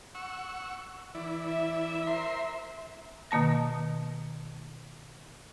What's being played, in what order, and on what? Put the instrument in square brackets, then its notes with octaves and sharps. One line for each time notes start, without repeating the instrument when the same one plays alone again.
[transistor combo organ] F#5 C#6 E6
E3 E4 D5
[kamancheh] E5
[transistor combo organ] A#4 C5 C6
[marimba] B2 D#3 A#3 A5 A#6